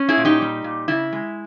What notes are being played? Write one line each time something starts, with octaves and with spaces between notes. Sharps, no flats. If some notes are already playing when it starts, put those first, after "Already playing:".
Already playing: C#4
E4 G#4
A#2
D#4 G4
G3
A#2
C#3 E4
G#3